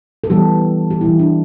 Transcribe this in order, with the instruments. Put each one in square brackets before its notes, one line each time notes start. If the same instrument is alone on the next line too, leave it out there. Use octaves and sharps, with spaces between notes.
[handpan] A4
E3 G3 B3 G4
G4
E3 G3 B3 E4
D4